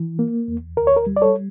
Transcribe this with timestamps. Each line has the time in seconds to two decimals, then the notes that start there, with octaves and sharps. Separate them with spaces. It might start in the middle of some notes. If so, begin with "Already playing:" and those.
Already playing: E3
0.19 A#3
0.48 E2
0.77 D2 A#4
0.87 C#5
0.96 A#4
1.06 G3
1.16 D5
1.22 A4 C#5